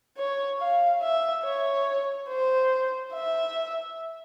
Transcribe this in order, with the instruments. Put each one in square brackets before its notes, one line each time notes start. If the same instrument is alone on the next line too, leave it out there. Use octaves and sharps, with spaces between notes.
[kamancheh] C#5
F5
E5
C#5
C5
E5